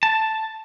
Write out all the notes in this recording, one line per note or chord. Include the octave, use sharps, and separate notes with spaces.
A5